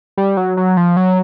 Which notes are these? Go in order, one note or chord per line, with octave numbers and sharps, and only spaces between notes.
G3
F#3
F#3
F3
F#3